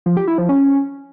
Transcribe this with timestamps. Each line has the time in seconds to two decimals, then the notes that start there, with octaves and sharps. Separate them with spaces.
0.06 F3
0.17 G4
0.27 E4
0.38 F3
0.49 C#4